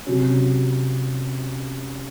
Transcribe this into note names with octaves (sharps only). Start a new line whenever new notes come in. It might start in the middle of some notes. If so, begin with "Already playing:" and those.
C3 F#3 C#4